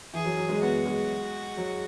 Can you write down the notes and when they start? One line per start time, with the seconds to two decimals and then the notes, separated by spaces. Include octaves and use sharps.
0.13 E3 G#4
0.25 F#3
0.37 F#3
0.49 G#3
0.62 B3 F#4
0.85 G#3
1.57 F#3